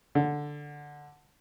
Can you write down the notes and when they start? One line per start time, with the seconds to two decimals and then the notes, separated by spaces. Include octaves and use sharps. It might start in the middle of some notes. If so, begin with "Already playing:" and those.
0.15 D3